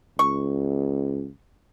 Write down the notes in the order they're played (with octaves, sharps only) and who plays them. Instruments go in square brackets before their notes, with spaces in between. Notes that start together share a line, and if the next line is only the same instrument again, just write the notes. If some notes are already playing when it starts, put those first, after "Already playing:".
[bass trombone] C#2 [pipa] C#6